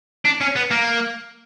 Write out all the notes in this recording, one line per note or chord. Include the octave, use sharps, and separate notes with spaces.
D4
C#4
B3
A#3